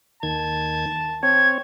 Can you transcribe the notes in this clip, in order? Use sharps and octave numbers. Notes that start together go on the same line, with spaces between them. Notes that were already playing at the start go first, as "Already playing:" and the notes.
D#2 D#3 A5 G#6
C4 C#5 G#6